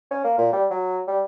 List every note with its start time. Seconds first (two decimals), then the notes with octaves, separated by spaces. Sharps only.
0.11 C#4
0.24 A#3
0.38 A#2
0.53 G3
0.70 F#3
1.08 G3